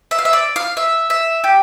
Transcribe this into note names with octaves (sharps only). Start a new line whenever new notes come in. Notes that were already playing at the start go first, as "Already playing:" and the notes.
E5
F5
E5
D5
F5
E5
E5
G4